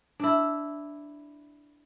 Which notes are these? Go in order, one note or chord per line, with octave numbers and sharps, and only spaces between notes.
D4 E4